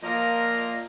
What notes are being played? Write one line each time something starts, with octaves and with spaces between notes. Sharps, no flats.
F3 A#3 F4 A#4 D5 D#5